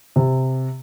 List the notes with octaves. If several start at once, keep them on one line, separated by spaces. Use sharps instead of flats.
C3